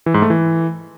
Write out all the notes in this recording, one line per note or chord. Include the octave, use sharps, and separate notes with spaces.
E3
G#2
A3
E3